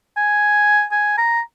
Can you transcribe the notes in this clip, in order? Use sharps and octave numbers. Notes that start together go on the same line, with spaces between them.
G#5
G#5
A#5